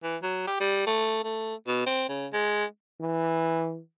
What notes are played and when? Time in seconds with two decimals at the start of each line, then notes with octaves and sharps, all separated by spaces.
0.03 E3
0.22 F#3
0.47 G4
0.60 G3
0.87 A3
1.24 A3
1.67 B2
1.86 C4
2.08 C#3
2.33 G#3
3.00 E3